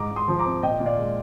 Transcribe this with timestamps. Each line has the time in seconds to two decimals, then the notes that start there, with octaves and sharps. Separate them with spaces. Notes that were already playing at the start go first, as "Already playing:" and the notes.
Already playing: G#2 A#5 D6
0.11 G#2
0.16 C6 D#6
0.28 F3
0.39 A#5 D6
0.46 C4
0.63 A#2 D#5 G5
0.80 A#2
0.86 D5 F5
0.98 G#3